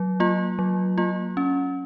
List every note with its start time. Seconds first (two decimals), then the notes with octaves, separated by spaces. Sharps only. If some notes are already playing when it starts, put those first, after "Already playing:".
Already playing: F#3
0.20 A#3 F4
0.59 F#3
0.98 A#3 F4
1.37 C#4